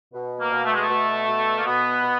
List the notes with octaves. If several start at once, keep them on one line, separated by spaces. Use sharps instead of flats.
B2
A#3
B2
A3
G#3
A3
B2
B2
A#3
B2 B3
B2